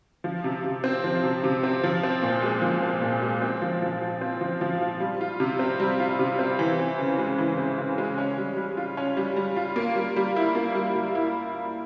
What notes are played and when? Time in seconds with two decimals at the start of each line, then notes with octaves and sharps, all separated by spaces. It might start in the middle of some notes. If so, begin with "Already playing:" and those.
0.24 F3
0.44 C3
0.64 C3
0.84 C4
1.04 F3
1.23 C3
1.44 C3
1.63 C4
1.84 F3
2.03 C4
2.22 A#2
2.42 G#3
2.62 F3
2.82 C4
3.02 A#2
3.22 G#3
3.42 C4
3.62 F3
3.82 F3
4.01 F4
4.21 C4
4.41 F3
4.61 F3
4.81 F4
5.00 G3
5.21 F4
5.40 C3
5.59 C4
5.80 G3
6.00 F4
6.19 C3
6.39 C4
6.59 E3
6.79 C4
6.99 C#3
7.18 G#3
7.38 E3
7.58 C4
7.78 C#3
7.98 G#3
8.18 C#4
8.38 G3
8.57 G3
8.77 F4
8.97 C#4
9.17 G3
9.36 G3
9.56 F4
9.76 A#3
9.96 G3
10.16 G3
10.36 E4
10.55 A#3
10.75 G3
10.95 G3
11.15 E4